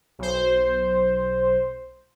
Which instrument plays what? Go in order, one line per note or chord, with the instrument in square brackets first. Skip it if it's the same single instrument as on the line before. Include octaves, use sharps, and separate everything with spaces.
[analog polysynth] B1 C5